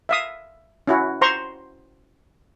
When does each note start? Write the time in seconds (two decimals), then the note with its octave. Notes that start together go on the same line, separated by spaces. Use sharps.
0.09 E5 F5 D#6
0.88 C#4 E4 F#4
1.21 C5 A#5 C6 C#6